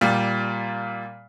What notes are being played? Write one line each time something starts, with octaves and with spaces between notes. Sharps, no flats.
A#2 G3